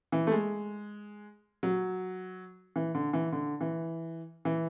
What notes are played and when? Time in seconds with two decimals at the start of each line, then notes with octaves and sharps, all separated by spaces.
0.12 E3
0.27 A3
0.32 G#3
1.63 F#3
2.76 E3
2.95 D3
3.13 E3
3.32 D3
3.61 E3
4.45 E3